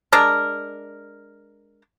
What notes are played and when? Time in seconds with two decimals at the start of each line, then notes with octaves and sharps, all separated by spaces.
0.12 G#3 D4 A#4